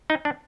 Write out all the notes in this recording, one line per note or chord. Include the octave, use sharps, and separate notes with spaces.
D#4
D4